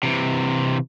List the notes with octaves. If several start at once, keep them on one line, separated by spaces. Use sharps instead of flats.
C3 E3